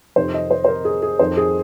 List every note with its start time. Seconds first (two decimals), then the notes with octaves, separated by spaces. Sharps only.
0.16 F2 C3 D#3 C5
0.34 D#5
0.51 C5
0.65 C5
0.68 A#4
0.85 G#4
1.02 G#4
1.19 F2 D#3 C5
1.37 G#4